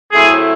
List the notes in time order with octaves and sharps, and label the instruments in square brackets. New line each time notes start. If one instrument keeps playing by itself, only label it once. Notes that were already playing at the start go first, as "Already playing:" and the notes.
[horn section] A2 F#3 A3 C4 E4 G#4